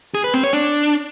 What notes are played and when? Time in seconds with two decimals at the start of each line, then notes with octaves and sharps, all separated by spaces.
0.15 G#4
0.24 B4
0.34 C4
0.43 C#5
0.53 D4